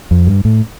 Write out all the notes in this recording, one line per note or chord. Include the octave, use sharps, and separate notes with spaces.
F2
G2
A2